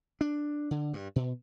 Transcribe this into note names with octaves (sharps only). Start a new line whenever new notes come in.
D4
D3
G2
B2